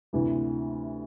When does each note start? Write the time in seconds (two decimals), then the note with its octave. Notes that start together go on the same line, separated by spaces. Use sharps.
0.13 D2 C3 E3